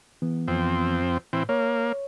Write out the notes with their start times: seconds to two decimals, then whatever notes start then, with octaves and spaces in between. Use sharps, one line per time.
0.22 E3 B3
0.48 F2 C4
1.33 A2 E3 C4
1.49 A#3 C#5